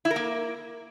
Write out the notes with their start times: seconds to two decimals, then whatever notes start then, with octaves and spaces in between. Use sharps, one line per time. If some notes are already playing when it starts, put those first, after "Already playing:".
0.05 E4
0.10 A#4
0.16 A#3